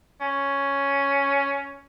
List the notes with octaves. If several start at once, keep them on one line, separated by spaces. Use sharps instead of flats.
C#4